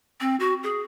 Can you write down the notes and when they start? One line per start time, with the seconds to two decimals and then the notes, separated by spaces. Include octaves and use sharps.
0.21 C4
0.40 F#4
0.63 G#4